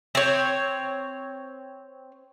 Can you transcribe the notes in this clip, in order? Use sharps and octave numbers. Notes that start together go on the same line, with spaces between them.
C4 C#5